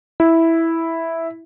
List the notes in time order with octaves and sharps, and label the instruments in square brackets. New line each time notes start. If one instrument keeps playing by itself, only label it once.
[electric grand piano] E4